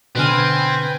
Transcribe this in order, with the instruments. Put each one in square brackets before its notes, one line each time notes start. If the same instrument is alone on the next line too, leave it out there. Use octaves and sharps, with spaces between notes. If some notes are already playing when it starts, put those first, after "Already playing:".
[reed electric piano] B2 D3 F6 [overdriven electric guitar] C4 [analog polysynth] B4 G5 G#5